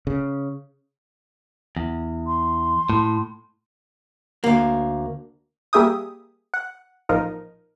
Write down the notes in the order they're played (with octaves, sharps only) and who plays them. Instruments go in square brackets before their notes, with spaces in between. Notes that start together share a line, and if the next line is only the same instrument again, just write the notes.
[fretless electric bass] C#3
[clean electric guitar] E2
[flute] C6
[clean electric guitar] A2
[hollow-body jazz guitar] D2 A#3
[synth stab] G3 A#3 G#4 E5 G5 D#6
F#5
A1 A#2 F3 D#4 A#4